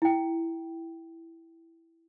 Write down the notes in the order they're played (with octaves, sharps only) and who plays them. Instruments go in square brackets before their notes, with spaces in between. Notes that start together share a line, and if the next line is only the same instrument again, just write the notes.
[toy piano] E4 G5